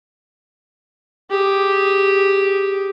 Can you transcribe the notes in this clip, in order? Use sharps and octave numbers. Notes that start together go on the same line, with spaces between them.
G4 G#4